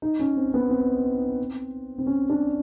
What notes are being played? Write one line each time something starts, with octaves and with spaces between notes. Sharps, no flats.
D#4
C#4
C4
B3
C4
C4
C#4
D4